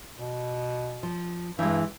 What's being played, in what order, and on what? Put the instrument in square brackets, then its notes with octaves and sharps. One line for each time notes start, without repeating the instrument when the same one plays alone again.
[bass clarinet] B2
[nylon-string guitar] F3
[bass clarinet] G2 [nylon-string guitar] E3 G#3